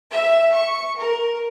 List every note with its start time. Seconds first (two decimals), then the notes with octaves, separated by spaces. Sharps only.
0.12 E5
0.54 C#6
1.01 A#4